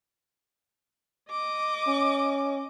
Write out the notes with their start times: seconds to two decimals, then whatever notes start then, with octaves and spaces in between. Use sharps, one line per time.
1.30 D#5 D6
1.88 C#4